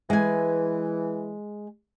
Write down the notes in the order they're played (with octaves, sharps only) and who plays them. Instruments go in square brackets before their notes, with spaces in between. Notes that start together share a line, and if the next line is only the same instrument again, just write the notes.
[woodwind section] E3 [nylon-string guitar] G#3 G#5